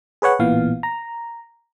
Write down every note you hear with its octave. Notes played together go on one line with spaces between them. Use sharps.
G#4 B4 C#5 F#5
A1 A#2 E3 B3 F5
A#5